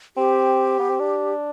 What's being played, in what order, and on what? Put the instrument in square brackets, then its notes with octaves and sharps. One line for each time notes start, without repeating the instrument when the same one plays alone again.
[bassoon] C4 [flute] G4
[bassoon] B3
C4
D4